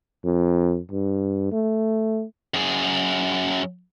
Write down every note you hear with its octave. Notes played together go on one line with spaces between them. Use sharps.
F2
G2
A3
F#2 G#4